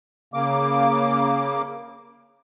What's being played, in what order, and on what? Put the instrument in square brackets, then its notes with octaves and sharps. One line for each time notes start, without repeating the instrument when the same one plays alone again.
[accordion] C#3 A#3 D6